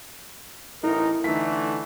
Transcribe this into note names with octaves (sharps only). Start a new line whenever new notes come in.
A1 D#4 E4 A#4
D3 E3 A3 D#4 B6